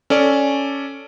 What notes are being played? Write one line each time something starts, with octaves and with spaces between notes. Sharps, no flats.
C#4 A4 D5